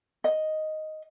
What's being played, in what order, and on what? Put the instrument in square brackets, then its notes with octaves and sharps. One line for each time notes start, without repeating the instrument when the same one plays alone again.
[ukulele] D#5